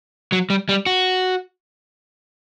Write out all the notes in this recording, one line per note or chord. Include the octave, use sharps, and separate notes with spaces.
F#3
G3
G3
F#4